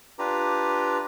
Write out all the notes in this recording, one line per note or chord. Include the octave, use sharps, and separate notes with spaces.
D4 F4 G4 B4 A#5